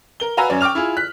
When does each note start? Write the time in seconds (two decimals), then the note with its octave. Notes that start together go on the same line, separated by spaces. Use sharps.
0.20 A#4 G7
0.37 F#4 B4 F5 G#5 A#5 E6
0.49 F#2 C#4 D5
0.61 G5 C#6 D6 F6 F7
0.75 E4 F4 G#4
0.97 F#6 B6